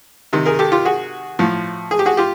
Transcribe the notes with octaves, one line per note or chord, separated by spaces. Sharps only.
C3 D#3
G#4 A#4
G4 A4
F4 G4
F#4 G#4
A2 F3
G#4
G4
F#4 G#4
F4 G4